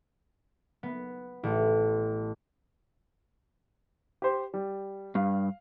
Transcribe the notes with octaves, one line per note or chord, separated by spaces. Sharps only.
B3
A1
G4 C5
G3
G2 F5